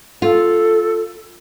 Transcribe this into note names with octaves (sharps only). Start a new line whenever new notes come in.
F4 A4